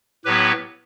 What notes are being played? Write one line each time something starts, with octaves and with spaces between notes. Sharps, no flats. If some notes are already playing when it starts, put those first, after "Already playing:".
A2 F#3 B3 G4 B4